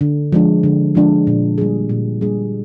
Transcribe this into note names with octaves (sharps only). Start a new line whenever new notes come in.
D3
F3 G#3 D4
D3
F3 G#3 D4
A#2
G3 A#3 D4 G#4
A#2
G3 A#3 D4 G#4